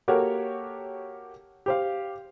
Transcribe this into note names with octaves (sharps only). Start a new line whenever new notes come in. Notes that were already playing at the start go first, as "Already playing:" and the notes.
A#3 F#4 G4 A4 A#4 C#5
G4 C5 F5